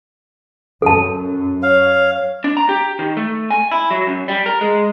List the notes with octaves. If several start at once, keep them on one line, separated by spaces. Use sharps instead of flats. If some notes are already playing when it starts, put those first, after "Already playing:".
F#2 A4 A5
C#5 F5
D4
A#5
G4
D#3
A3
G#5
E4
F#3
F#2
G3
A#4
G#3